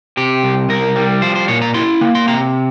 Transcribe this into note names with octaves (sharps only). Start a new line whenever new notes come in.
C3 G4
C2
C2 A#4
G3
F3 C5
C5
A#2 C#5
A#5
E4 C6
A#3
C6
C3 A#5